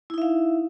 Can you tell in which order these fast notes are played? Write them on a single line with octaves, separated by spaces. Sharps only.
E4 D#4 E5 F5